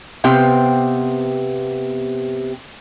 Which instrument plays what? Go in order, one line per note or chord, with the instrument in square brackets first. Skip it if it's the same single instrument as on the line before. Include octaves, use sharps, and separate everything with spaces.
[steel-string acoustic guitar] C3 B3 C4 G4 F5 G5